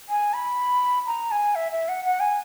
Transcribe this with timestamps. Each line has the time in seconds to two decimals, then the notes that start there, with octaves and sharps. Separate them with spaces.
0.09 G#5
0.33 B5
1.07 A#5
1.31 G#5
1.55 E5
1.72 E5
1.88 F#5
2.05 F#5
2.20 G#5